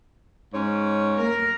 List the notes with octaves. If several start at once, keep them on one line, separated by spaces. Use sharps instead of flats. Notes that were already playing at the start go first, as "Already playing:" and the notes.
G#2 C#4 C#5
A#3 A#4